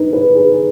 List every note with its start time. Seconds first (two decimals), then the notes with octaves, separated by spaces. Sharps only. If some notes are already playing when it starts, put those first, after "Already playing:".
Already playing: D#4 B4
0.13 B4
0.35 G#4